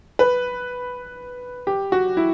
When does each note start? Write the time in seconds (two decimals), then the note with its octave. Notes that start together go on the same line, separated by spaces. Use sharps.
0.19 B4
1.67 G4
1.92 F#4
2.17 E4